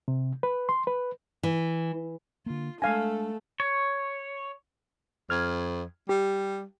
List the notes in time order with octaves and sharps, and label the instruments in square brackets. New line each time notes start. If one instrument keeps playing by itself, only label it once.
[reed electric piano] C3
B4
C6
B4
[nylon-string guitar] E3
[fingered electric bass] D3 A#3 [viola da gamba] F4
[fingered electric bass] G#3 D4 [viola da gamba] A3 [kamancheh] A4 [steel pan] F5 G#5
[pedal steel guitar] C#5
[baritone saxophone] F2 [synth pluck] F6 G#6
[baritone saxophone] G3 [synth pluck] G4